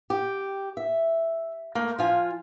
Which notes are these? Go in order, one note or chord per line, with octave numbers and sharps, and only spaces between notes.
G4
E5
A3 A#3
F3 F4 G#5